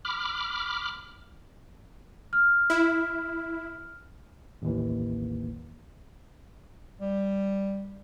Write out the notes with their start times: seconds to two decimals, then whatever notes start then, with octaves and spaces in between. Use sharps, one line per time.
0.05 B5 D6 F6
2.33 F6
2.70 E4
4.62 A1 D#2 E3
7.00 G3